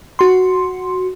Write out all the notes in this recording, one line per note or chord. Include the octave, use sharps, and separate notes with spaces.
F#4 C6